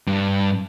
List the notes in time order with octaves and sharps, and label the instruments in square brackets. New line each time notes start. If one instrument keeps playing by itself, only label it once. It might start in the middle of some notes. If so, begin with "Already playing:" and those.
[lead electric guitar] G2